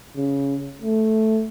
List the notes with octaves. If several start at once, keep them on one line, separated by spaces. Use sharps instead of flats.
C#3
A3